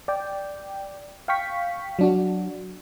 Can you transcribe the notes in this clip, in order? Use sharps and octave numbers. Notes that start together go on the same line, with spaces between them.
D5 G5
F5 G5 C#6 B6
F#3 D4 F#4